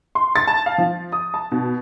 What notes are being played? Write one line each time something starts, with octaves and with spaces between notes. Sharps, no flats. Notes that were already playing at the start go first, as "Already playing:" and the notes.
C6
A6
A5
F5
F3
D#6
A5
B2